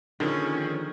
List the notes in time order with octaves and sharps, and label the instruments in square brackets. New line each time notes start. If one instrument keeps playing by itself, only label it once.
[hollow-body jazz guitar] D#2 F3 [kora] D3 [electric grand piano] D#3 [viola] C#4 G#4